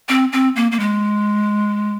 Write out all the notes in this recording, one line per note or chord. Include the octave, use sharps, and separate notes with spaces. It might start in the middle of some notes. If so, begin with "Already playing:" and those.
C4
C4
A#3
A#3
G#3